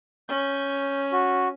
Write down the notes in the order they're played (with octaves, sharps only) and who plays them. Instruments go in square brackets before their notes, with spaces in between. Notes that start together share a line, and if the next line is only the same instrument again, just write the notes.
[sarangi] C#4 [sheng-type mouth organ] G6
[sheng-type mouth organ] F#4